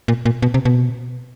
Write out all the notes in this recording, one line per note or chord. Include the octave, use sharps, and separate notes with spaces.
A#2
A#2
B2
C3
B2